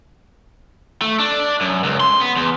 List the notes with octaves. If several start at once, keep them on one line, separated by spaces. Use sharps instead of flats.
A3
D4
F#2
C#2
C6
B3
E2